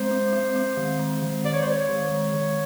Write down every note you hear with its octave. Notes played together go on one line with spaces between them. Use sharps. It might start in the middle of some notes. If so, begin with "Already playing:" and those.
Already playing: G#3 C4 C5
C4
C4
C4
D#3
G#3
D#3
D#3 D5
C#5
C5
D#3 C#5
D#3
G#3
D#3